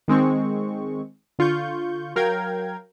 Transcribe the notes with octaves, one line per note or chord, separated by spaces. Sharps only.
D#3 G#3 C4 C#6
D3 F4 C#6 G6
F#3 A#4 F5 G5 G#6